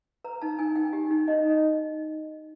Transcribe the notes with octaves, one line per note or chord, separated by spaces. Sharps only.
B4 A#5
D#4 A5
D#4 G#5
D#4 G5
G4
D#4
D#4 D#5